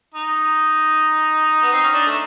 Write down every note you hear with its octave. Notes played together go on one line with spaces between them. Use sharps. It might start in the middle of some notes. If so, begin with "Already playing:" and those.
D#4
B3
C4
C#4
D4
A3